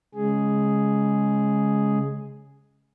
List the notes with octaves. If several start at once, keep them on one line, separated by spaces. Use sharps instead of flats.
C#3 G#3 G#4